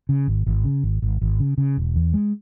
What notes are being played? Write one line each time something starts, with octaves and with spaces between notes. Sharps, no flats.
C#3
G#1
G#1
C#3
G#1
G#1
G#1
C#3
C#3
E1
E2
G#3